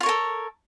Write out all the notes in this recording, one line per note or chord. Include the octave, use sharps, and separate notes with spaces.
F4 A4 A#4 C#5